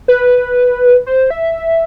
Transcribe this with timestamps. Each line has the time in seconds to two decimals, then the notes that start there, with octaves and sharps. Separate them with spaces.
0.08 B4
1.06 C5
1.31 E5